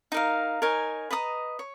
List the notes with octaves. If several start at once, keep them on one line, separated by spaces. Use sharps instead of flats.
D#4 A#4 F5
D#4 A#4 C#5 G#5
B4 D#5 A#5 D#6
C#5